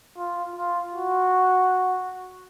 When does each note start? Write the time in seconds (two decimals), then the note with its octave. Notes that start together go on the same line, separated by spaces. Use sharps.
0.18 F4
0.56 F4
0.94 F#4